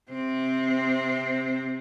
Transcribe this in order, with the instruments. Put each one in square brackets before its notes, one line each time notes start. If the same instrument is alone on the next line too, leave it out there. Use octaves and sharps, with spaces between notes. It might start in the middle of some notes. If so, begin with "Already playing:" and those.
[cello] C3 C4